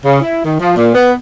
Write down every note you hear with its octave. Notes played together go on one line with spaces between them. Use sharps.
C#3
E4
D#3
F3
A#2
B3